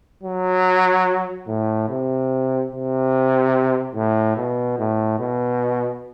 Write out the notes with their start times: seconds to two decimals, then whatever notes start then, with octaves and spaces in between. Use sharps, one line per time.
0.23 F#3
1.47 A2
1.89 C3
2.72 C3
3.95 A2
4.37 B2
4.79 A2
5.20 B2